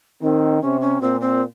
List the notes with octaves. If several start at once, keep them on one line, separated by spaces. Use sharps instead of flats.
D#3 C4
C3 C#4
C#4
A#2 C4
C4